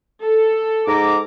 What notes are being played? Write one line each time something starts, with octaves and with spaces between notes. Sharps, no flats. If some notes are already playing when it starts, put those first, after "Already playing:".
A4
G#2 A#5 D6